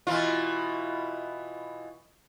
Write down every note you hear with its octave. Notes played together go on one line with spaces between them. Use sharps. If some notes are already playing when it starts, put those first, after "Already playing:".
B2 E3 F4